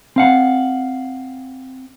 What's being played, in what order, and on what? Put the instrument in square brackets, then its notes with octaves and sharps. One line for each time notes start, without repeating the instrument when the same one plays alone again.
[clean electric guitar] C4 F5 F#5